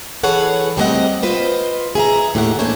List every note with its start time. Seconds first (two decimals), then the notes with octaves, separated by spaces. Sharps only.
0.23 E3 G#4 A4 B4 C#5 F#5
0.77 G3 A3 B3 C4 D#5 F#5
1.22 F4 B4 C5 D#5
1.95 G#4 E5 F5 A#5
2.34 D#2 A2 G4 F#5
2.59 E3 A3 A#3 D4 C5 C#5